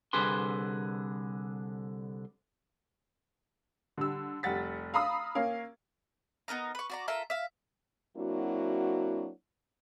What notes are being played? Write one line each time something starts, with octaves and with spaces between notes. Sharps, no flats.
C2 D3 G#4 B4 C6
D3 G3 E6
F1 G3 F#5 A6 B6
F5 A#5 B5 D#6 E6
A#3 C#4 F5
B3 D#4 A#4 A#5
B4 C#6
F#4 D5 A#5
F4 A4 A#4 E5
E5 F5
F#3 A#3 C4 D4 E4 F#4